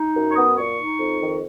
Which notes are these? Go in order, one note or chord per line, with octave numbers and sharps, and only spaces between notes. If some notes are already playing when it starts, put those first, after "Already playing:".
Already playing: D#4
F#2
C#6
B3 D#6
A#2 C#6
D#4
F2
D#3